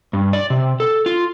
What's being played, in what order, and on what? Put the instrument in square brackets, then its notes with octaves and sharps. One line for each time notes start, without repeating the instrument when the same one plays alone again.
[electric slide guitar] G2
D5
C3
A4
F4